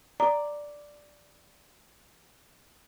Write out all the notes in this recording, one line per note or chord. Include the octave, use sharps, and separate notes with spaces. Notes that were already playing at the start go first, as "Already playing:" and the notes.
D5 A#5